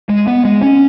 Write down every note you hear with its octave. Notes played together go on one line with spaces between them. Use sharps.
G#3
B3
G#3
C#4